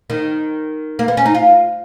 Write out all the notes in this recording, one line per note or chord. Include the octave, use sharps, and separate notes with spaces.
D#3
A#3
B3
C#4
D#4
F4